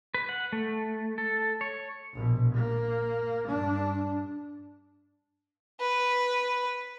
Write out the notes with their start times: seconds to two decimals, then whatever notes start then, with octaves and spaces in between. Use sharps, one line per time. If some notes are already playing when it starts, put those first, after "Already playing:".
0.14 B4
0.29 F#5
0.52 A3
1.18 A4
1.61 C#5
2.14 A#1 B2
2.55 A#3
3.48 G2 D4
5.80 B4